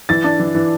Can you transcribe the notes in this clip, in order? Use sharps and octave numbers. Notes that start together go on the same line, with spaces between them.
E3 A6
D4
E3
E3